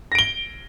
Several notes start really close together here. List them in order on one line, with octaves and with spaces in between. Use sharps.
A#6 D7 G7